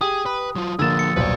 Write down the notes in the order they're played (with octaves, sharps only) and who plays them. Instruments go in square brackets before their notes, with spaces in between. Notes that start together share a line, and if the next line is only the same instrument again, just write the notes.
[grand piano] G4 [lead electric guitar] G#4 [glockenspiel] D#6
[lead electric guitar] B4
F#3 F4
[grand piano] D3 A#3 E7 [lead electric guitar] F3 G#4 [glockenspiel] E6 A6
[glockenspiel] C#7
[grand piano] D#1 B1 C5 [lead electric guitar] B4 D5